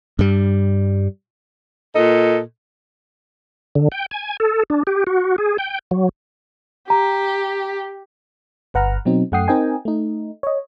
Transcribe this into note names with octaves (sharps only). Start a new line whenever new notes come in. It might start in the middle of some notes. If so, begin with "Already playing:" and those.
G2 G3
A#2 A4 D#5
D3
G5
G#5
A4
D4
G4
F#4
G#4
G5
F#3
G4 A#5
G1 B4 F#5 A#5 F6
B2 F#3 C4 D#4
F#2 A3 F#5 G5 D#6 C7
C4 D#4 A#4 D#5 G5 G#5
A3 D#4
C#5 D#5